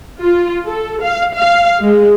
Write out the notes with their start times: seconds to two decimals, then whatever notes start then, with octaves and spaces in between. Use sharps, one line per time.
0.21 F4
0.66 A4
1.01 F5
1.34 F5
1.82 G#3